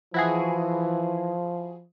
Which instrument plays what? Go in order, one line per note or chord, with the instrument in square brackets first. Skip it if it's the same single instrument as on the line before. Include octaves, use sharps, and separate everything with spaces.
[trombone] E3 [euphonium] F3 [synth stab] E4 F#4 G#4